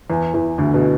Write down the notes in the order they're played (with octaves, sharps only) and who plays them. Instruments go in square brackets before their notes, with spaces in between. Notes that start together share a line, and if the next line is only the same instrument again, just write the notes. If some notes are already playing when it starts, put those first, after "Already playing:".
[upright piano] E2 E3
E2 E3
D2 D3
B2